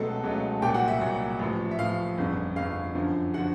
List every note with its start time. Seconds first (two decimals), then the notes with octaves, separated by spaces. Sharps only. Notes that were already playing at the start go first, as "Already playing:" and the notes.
Already playing: C#2 B2 F#3 A3 A4 A5
0.23 C#2 B2 F#3 A3
0.62 C2 A#2 F#3 G4 G5
0.74 F#4 F#5
0.88 E5
1.01 C2 A#2 F#3
1.39 A1 A2 F3
1.71 E5
1.79 A1 A2 F3 F5
2.18 G1 F2 C#3
2.56 G1 F2 C#3 F5
2.95 F#2 D3 F3
3.34 D3 F3 F#4 F#5